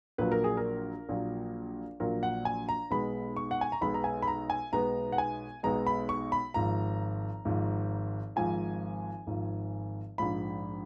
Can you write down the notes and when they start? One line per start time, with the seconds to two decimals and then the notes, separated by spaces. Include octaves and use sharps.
0.18 A#1 A#2 F#3 B4
0.32 A#4
0.44 G#4
0.57 A#4
1.09 A#1 A#2 F#3
2.00 A#1 A#2 F#3 A#4
2.23 F#5
2.45 G#5
2.69 A#5
2.90 B1 B2 G#3 B3 B5
3.37 C#6
3.51 F#5
3.61 G#5
3.72 A#5
3.81 B1 B2 G#3 B3 B5
3.94 A#5
4.04 G#5
4.22 B5
4.27 A#5
4.50 G#5
4.72 B1 B2 G#3 B3 A#5
5.12 F#5
5.18 G#5
5.63 B1 B2 G#3 B3 A#5
5.87 B5
6.09 C#6
6.32 B5
6.54 G#1 G#2 F3 A#5
7.45 G#1 G#2 F3
8.36 G#1 G#2 F3 G#5
9.27 G#1 G#2 F3
10.18 A#1 G#2 F3 B5